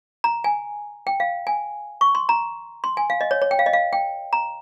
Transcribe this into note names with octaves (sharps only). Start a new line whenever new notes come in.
A#5
G#5
G5
F5
G#5
C#6
C6
A#5
C6
G#5
F5
D#5
C#5
C#5
G5
F5
D#5
F5
G5
A#5